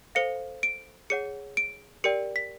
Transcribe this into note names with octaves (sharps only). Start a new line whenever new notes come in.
A4 C5 F5 C#7
D7
G#4 C#5 F#5 C#7
D7
G4 A#4 D5 G5 C#7
B6